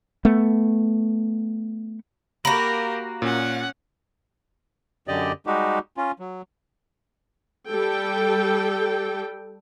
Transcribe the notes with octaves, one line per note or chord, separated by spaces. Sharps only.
A3 B3
A#3 F#4 G4 A#4 B5
A#2 C#4 F#5
F#2 D3 G4 D5 D#5
G3 G#3 D#4 F#4 G4
C#4 F4
F#3
G3 A4 G5